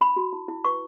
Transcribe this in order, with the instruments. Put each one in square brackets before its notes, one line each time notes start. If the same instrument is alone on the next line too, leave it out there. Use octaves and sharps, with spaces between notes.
[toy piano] D#4 B5
F#4
E4
E4
B4 C#6